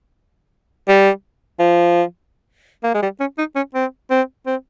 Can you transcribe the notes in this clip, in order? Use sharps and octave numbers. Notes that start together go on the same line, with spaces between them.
G3
F3
A#3
G#3
G3
C#4
D#4
C#4
C4
C4
C4